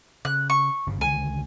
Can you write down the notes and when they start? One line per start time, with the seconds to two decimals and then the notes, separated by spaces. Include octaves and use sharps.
0.25 C#3 F#6
0.50 C#6
0.87 G1 G2 C#3
1.01 C#2 D3 D#3 G#5